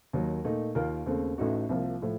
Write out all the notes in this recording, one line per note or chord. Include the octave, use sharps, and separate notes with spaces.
D#2 D#3 F#3
A#2 A3 D#4
D#2 D#3 A#3 F4 A#4
D#2 C#3 A3 C4
A1 A2 A3 D#4 F#4
C2 C3 F3 A#3 F4
A2 F3